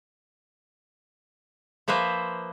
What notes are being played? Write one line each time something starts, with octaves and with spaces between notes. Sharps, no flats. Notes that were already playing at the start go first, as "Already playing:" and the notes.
F3 A#3 B4 C5 E5